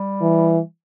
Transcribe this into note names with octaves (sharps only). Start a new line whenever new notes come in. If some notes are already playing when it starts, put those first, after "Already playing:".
Already playing: G3
E3